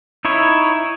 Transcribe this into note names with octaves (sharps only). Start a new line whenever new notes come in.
D#4 E4 C#5